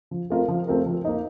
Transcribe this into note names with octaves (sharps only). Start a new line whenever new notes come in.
F3
A3 C4 F4 A#4
F3
A3 C4 F4 A#4
F3
A#3 D#4